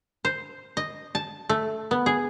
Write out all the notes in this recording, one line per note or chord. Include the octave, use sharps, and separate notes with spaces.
C5
D#5
A5
A3
B3
G#4